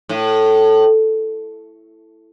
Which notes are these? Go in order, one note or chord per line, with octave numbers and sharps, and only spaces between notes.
A2